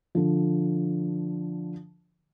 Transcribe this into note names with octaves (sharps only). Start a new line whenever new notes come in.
D3 F3